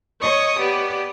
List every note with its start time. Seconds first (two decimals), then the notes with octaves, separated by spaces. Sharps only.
0.21 C#5 D#5 C#6 D#6
0.58 B3 G4 D5